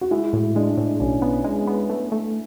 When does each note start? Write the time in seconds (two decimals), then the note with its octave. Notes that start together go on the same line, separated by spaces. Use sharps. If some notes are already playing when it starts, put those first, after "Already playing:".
0.01 F#4
0.11 G#3 E4
0.33 A2
0.55 G#3 D4
0.77 A2
1.00 B1 C#4
1.22 B3
1.44 G#3
1.67 B3
1.90 A3
2.12 A3